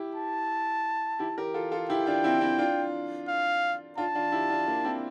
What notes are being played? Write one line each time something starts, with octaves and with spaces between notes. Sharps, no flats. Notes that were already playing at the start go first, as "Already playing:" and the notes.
Already playing: E4 G4
A5
E4 G4
G4 A#4
F4 A4
F4 A4
E4 G4 G5
D4 F4
C4 E4
C4 E4
D4 F4
F5
D4 F4 A5
D4 F4
E4 G4
D4 F4
A#3 D4
C4 E4